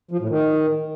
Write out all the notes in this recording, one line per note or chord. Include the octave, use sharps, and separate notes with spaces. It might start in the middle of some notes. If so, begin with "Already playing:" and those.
F3
A2
D#3